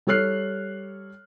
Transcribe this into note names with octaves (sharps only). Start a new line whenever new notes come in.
G3 A4 C#5 F6 F#6 C7